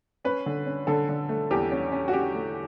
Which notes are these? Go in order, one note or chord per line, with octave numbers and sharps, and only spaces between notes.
C#4 B4
D3
C#4
D3 A4
D3
A3
E2 G4
C#4
C#4
F#4
C#4 G4
A3